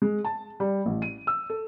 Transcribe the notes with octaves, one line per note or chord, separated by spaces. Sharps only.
G#3
A5
G3
A1
D#7
E6
A4